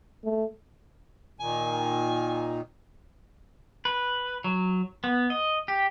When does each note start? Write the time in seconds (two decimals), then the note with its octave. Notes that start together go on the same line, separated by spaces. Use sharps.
0.24 A3
1.40 A#2 D#3 G#5
3.85 B4
4.44 F#3
5.04 B3
5.30 D#5
5.68 G4